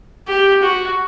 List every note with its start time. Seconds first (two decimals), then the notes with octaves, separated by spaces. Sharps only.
0.28 G4
0.63 F#4